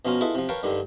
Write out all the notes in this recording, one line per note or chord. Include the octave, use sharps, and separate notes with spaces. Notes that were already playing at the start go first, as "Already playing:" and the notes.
B2 F3 C#4 F4 A#5
E4 F4 G#4 A4 B4 D#5
C3 F3
A#4 B4 C#5 F5 G5 A5
G2 D3 D#3 G3